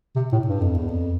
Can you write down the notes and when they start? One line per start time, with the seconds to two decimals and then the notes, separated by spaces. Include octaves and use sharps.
0.15 C3
0.32 A2
0.47 G2
0.61 F2
0.74 E2
0.88 F2